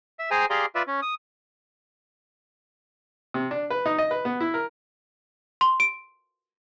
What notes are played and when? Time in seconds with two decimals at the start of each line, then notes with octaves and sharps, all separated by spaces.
0.19 E5
0.31 G#4 C5 G5 G#5 A#5
0.50 G4 G#4 D5 F5 A#5 C6
0.75 F4 B4 D5 E5
0.87 C#4
1.02 D#6
3.34 C3
3.51 D4
3.70 B4
3.86 D#4
3.98 D#5
4.11 B4
4.25 B3
4.41 E4
4.54 A#4
5.61 C6
5.80 D7